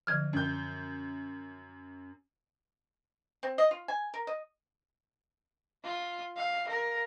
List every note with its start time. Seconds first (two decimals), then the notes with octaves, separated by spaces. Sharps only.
0.07 D3 F3 F#3 F6 G#6
0.33 F#2 G6
3.43 C4
3.58 D#5
3.71 F4
3.88 G#5
4.14 A#4
4.27 D#5
5.84 F4
6.36 F5
6.68 A#4